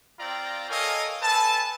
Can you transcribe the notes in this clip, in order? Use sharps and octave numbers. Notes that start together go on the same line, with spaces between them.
C4 F4 D5 F5 G5 A#5
A4 A#4 C#5 D#5 F5 G#5
A4 B4 G#5 A5